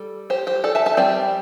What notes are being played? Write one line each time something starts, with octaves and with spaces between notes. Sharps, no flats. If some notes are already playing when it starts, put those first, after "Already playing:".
Already playing: G3 A4
G4 C5
G4 C5
A4 D5
E5 A5
E5 A5
G3 C4 D5 G5